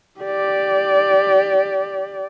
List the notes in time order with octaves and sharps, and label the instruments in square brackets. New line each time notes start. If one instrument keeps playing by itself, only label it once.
[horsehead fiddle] G4 D5